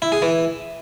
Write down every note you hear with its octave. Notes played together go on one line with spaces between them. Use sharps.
E4
G#4
E3